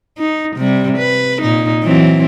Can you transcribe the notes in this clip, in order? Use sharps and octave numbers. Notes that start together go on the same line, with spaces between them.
D#4
C3 G3
B4
A#2 D#4
E3 F#3 C4